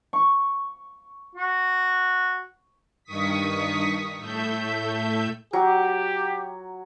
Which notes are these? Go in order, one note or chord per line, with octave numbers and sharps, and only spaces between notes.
C#6
F#4
G2 D#3 C#6 D#6 B6
A2 A3 E5 G6
F#3 G4